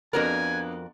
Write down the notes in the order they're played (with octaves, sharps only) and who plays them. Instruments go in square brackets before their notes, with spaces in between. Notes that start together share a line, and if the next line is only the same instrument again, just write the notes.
[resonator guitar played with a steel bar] F2 F#4 A#4 [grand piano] A#3 B3 D4 [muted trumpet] G#5